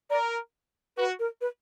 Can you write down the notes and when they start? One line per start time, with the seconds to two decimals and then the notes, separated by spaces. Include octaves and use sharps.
0.10 A#4 D5
0.97 F#4 B4
1.19 A#4
1.41 B4